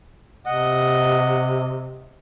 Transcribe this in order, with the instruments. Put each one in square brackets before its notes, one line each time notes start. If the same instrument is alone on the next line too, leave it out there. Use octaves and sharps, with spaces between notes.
[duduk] C3 [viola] D#5 [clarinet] F#5